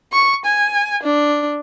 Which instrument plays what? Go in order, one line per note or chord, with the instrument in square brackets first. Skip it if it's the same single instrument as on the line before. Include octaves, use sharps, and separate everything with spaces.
[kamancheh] C#6
G#5
D4